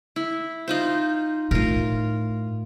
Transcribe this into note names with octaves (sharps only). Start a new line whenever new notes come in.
E4
D#4 F4 C5
A2 F4 A#4